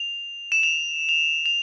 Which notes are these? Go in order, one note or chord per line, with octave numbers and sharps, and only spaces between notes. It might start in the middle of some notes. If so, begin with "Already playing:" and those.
Already playing: F7
E7
F7
F7
F7